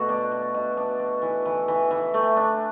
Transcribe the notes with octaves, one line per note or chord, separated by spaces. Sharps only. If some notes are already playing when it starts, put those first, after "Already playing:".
Already playing: B2 A3 F#4
D4
F#4
B2
D4
F#4
E3
E3
E3
E3
A3
D4